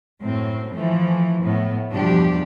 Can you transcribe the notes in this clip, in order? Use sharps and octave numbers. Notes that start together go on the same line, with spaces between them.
F#2 A2 C4
E3 F3 A3
A2 B3
E2 G2 B2 F3 D4 G4